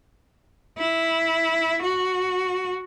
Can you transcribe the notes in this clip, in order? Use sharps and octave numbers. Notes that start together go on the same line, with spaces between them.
E4
F#4